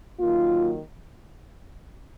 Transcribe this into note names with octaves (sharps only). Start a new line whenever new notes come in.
D#3 F#3 A#3 F4